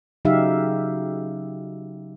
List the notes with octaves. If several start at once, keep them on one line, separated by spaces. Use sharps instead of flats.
C#3 F#3 D#4 G4 E5 F5